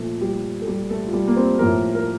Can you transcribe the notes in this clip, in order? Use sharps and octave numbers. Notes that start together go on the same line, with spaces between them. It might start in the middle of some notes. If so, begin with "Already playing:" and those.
Already playing: A#2 F3 A3 A4
G3 G4
A4
G3 G4
A3 A4
F4
G3 G4
A#3
C4
A2 F3 A#3 A#4
A#4